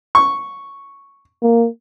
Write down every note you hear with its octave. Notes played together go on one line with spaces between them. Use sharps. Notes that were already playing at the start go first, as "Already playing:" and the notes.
C#6
A#3